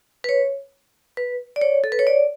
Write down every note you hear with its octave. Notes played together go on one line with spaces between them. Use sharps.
B4
C#5
B4
D5
C#5
A4
B4
C#5
D5